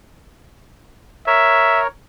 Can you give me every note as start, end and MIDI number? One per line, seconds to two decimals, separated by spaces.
1.27 1.87 70
1.27 1.87 73
1.27 1.81 76